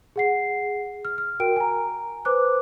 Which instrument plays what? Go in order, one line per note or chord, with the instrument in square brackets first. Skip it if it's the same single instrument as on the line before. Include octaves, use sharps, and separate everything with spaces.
[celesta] G#4 F#5 C7
F6
F6
F#4 A#4 G5 D7
G#5 A#5
B4 C5 D6 F#6